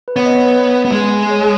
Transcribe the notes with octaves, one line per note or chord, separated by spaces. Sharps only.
B4
B3 C#5
D#5
C#5
B4
B3
G#3
C#5